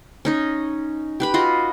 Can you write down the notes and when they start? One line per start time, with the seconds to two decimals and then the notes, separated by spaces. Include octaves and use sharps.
0.25 C#4 D#4 D#5
1.20 G4 B4 B5
1.34 F4 F#4 D#5